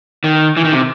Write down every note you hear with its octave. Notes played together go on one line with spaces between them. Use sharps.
D#3
E3
D#3
C3